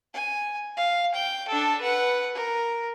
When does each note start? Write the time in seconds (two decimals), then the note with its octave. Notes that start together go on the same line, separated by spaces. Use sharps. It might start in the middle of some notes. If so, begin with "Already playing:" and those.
0.14 G#5
0.77 F5
1.15 G5
1.48 D4 A4
1.81 B4 F#5
2.35 A#4